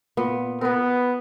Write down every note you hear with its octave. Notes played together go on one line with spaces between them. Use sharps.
A#2 B3
B3 A#4 B4